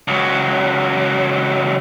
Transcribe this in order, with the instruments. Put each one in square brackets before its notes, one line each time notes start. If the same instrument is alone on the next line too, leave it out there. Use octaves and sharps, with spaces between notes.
[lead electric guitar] C#2 F#3